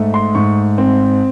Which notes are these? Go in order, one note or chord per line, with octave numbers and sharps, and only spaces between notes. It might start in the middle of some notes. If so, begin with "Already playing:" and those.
Already playing: G#2 A3
C6
G#2 C#6
C4